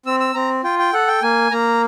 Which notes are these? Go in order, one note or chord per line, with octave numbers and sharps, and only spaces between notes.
C4 E6
E6
C4 A#5
F4 G5
G5
A4 F#5
G5
A#3 G#5
A#3 A#5